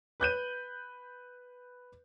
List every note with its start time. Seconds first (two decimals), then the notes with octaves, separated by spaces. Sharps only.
0.20 B4 F#6 G6 D#7